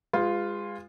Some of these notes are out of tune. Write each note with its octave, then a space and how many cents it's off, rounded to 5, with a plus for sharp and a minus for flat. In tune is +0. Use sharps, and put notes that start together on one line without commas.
G#3 -30 F4 +0 B4 +25